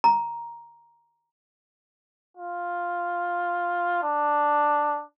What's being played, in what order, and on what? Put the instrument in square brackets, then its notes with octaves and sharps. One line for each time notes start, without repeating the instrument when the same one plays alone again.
[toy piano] A#5
[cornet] F4
D4